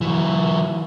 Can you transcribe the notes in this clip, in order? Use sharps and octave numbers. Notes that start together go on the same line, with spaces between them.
E3 F#3